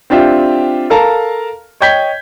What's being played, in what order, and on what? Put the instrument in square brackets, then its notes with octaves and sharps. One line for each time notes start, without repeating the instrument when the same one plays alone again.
[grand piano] C4 D4 F4 G4 E5
A4 A#4 F5 A5 A#5
C#5 D#5 G5 G6 G#6 B6